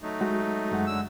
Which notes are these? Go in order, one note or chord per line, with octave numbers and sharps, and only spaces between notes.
F#3 A3 D#4
G#3 F#4
F#2 G#3 F#5
D3 F#3 E6